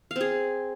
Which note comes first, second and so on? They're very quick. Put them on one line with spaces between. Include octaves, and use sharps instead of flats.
F5 C4 G#4